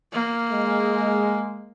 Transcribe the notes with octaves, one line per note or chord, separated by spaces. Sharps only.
A#3
G#3